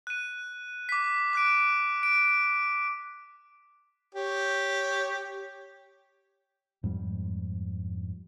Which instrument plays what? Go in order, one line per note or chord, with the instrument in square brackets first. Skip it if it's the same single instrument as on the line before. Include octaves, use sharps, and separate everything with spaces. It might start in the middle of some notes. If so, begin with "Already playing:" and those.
[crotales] F#6 D#7
D6 B6
D6 F#6 D7
D7
[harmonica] G4 C#5
[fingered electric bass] F2 G#2 G3